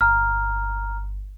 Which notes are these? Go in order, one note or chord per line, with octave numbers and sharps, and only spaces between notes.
G1 A#5 F6